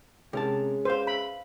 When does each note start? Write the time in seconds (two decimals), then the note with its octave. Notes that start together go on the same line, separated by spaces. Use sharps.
0.33 C3 G#3 C#4 A#4 A5
0.85 B4 C5 F5
1.07 B5